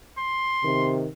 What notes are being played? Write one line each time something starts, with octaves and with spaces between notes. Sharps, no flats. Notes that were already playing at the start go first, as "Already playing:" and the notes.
C6
C3 D#3